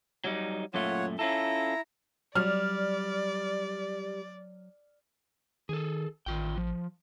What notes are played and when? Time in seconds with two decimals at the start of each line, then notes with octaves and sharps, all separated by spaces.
0.24 F#3 G3 D#4
0.74 F#2 A#2 A3 F4 C#5 F#5
1.19 C#4 E4 F4 A4 A#5
2.35 F#3 G3 D5 F6
5.69 D#3 G#4 A4
6.26 A1 D#3 F4 G5
6.58 F3